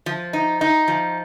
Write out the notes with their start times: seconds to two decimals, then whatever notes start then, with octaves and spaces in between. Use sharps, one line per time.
0.06 F3
0.33 D#4
0.61 D#4
0.88 F3